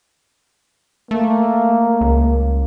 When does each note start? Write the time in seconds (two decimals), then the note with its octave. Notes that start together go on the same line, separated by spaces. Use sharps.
1.11 A3 A#3
2.01 C#2